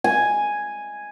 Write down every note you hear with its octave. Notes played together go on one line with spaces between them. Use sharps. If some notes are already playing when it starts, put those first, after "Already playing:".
G#5